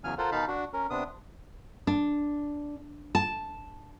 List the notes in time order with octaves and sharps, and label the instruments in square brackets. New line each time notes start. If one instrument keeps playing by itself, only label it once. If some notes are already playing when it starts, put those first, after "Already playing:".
[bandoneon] E2 C#3 F#3 G#5 F6
F4 A4 A#4 C5 F#5
B2 D#3 D#4 F5 A5 B5
D4 F#4
C#4 A#4
C3 B3 D4 D#6
[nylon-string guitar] D4
A5